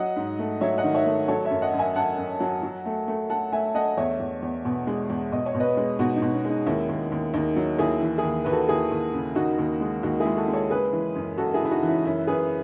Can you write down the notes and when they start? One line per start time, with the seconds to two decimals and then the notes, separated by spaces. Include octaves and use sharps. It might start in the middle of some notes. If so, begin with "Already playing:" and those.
Already playing: F#3 D#5 F#5
0.16 G#2
0.39 A3
0.61 F#3 C#5 E5
0.78 D#5 F#5
0.84 D#3
0.95 C#5 E5
1.06 A3
1.28 F#3 A4 C#5
1.45 C#5 E5
1.50 F#2
1.62 D#5 F#5
1.74 F#2
1.79 E5 G#5
1.96 F#2 F#5 A5
2.18 F#2
2.40 F#3
2.63 F#3
2.86 A3
3.08 A3
3.30 A3 F#5 A5
3.53 A3 E5 G#5
3.75 A3 D#5 F#5
3.97 E2 C#5 E5
4.20 E2
4.42 E2
4.65 B2
4.87 G#3
5.10 E2
5.32 B2 D#5
5.46 C#5
5.55 B2
5.60 B4 D#5
5.77 G#3
5.99 B2 D#4 F#4
6.16 D#4
6.22 B2
6.33 C#4
6.45 G#3
6.50 D#4
6.66 D#2 C#4 E4
6.89 D#2
7.12 D#2
7.34 D#2 D#4
7.56 F#3
7.79 D#2 E4 G#4
8.01 E3
8.18 E4 G#4
8.24 D#2
8.44 D#2 B4
8.52 F#4 A4
8.69 D#2 E4 G#4
8.91 D#2
9.14 C#3
9.35 D#2 D#4 F#4
9.58 D#2
9.81 G#3
10.03 D#2 D#4 F#4
10.20 E4 G#4
10.26 G#3
10.37 F#4 A4
10.48 G#3
10.54 A4 C#5
10.70 C#3 G#4 B4
10.93 E3
11.15 F#2
11.37 F#2 F#4 A4
11.54 E4 G#4
11.60 C#3
11.65 E4
11.71 D#4 F#4
11.83 E3
11.88 C#4 E4
12.05 F#2 C#4 E4
12.27 F#2 G#4 B4